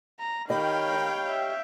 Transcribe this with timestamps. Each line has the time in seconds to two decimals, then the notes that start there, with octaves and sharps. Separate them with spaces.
0.20 A#5
0.50 D#3 G4 C#5 D#5 F5 G5 B5
1.28 E5